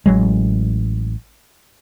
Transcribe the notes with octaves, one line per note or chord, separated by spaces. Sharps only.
A1 F#3 G#3